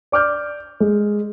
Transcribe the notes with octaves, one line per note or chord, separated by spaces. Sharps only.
D5 D6 F6 G6
G#3